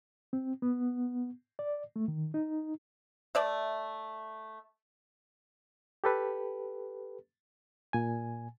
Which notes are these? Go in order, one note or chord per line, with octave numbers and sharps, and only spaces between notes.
C4
B3
D5
A3
D#3
D#4
A3 D5 E5
G4 A4 B4
A#2 G#5